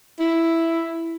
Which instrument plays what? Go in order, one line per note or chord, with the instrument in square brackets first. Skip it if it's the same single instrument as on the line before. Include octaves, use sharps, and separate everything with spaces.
[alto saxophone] E4